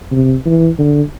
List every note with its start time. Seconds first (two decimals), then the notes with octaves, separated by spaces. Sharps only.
0.11 C3
0.45 E3
0.79 D3